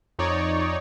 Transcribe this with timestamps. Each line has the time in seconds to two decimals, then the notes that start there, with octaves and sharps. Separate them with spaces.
0.19 F2 D#4 C#5 D5